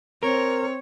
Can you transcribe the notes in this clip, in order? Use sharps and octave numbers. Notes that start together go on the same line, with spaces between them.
C4 A#4 C#5